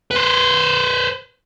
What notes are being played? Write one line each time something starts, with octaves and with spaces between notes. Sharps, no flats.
B4 C5